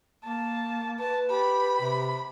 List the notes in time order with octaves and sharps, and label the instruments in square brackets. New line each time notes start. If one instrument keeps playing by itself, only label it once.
[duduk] A#3 [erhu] A5
[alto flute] B4 [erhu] A5
[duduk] G4 [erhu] B5
[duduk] C3